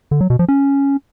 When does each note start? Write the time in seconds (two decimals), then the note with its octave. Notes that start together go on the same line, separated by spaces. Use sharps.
0.11 D3
0.21 F#3
0.30 B2
0.39 F3
0.48 C#4